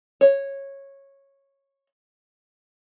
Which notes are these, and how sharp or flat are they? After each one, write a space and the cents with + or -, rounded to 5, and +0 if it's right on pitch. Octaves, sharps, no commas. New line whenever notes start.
C#5 -10